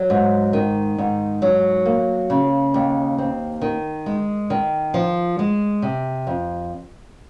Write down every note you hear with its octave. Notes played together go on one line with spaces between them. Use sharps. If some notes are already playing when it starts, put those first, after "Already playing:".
Already playing: F#3
G#2
D#3
G#2
F#3
A#3
C#3
D#2
C4
D#3
G#3
D#3
F3
G#3
C3
F2